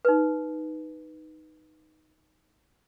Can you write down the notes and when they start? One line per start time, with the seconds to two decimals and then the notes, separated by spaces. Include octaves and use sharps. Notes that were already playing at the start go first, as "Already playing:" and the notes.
0.05 D#4 B4